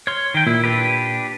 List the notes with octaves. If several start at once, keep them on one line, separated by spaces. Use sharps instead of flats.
C#5 C6 F6
D#3 G5
A#2 E4
D4 G4 B4